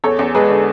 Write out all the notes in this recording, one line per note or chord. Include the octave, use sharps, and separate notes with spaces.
E2 A4 C#5
E2
G#3 G#4 B4
D3